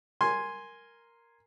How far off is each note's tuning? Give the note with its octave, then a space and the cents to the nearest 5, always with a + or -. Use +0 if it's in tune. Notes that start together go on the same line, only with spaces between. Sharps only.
A#4 +0 G#5 +0 C6 +0